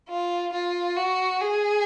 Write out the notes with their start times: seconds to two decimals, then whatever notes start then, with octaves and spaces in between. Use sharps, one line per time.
0.09 F4
0.53 F4
0.97 F#4
1.40 G#4